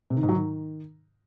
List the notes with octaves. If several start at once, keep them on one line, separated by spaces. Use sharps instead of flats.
C3
D#3
G#2
F#3
D#3